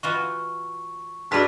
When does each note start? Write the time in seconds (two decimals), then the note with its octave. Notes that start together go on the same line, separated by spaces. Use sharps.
0.03 E3 F4 F#4 C#6
1.32 G2 A#3 D4 E4 F#4 G#4 C6 B6